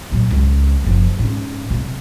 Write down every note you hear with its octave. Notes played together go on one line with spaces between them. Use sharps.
A#2 F#3
C#2
F#1 F3
G#2 C#4
C3 F#3